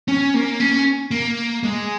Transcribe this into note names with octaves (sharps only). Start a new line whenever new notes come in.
C#4
A#3
C#4
A#3
G#3